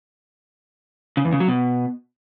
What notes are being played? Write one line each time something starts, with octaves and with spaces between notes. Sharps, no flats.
C#3
E2
C#3
F#3
B2